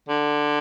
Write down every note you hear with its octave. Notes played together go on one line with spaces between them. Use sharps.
D3